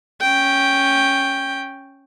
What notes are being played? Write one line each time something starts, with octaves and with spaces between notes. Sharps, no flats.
C#4 G5